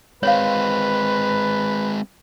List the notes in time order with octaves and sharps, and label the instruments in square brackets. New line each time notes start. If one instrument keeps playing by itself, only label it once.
[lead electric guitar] G#3 C4 [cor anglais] B4 [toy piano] C#5 F5